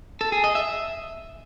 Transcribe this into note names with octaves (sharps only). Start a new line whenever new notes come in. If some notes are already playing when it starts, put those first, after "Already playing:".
A4
G#4
D#5
E5